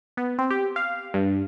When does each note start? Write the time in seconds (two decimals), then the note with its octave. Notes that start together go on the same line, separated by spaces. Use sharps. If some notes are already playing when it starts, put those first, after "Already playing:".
0.17 B3
0.38 C4
0.51 G4
0.76 F5
1.14 G2